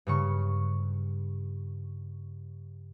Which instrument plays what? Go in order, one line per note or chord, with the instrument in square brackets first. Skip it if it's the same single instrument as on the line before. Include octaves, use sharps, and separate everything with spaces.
[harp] G2 C#3 C#6